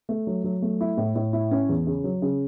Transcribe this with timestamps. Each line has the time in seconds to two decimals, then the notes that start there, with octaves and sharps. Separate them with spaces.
0.09 A3
0.27 F#3
0.44 F#3
0.62 A3
0.81 E4
0.97 A2
1.15 A2
1.33 E4
1.51 C#4
1.69 E2
1.87 C#3
2.04 F#3
2.22 C#3